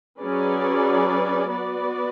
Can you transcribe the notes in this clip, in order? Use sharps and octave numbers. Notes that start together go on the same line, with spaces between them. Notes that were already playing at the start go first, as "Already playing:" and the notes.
F#3 C#4 G#4 B4 D5
B3 F#4 B4 D5